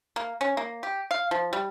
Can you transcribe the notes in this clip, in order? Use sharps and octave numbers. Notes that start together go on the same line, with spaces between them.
A#3
C#4
A#3
G4
F5
F3
G3